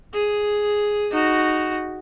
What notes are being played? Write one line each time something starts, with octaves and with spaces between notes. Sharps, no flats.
G#4
D#4 F#4